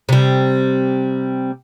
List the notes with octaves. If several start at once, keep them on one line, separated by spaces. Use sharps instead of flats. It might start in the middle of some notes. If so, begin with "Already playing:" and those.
C3 G3